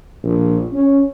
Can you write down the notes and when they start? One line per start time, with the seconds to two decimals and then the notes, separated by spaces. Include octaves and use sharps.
0.24 A#1
0.73 C#4